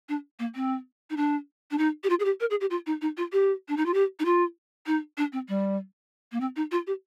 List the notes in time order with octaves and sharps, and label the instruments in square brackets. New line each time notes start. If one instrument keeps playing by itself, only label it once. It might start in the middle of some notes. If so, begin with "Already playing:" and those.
[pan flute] D4
A#3
C4
D#4
D4
D4
D#4
G4
F4
G#4
G4
A#4
G#4
G4
F4
D#4
D#4
F4
G4
D4
D#4
F4
G4
D#4
F4
D#4
D4
C4
G3
A#3
C4
D#4
F4
G4